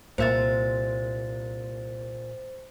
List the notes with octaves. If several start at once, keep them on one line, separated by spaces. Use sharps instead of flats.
C2 A#2 C5 E5 A6